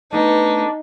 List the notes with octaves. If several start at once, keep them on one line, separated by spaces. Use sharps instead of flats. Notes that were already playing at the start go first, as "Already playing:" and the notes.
A3 B3 D4 D#4 B4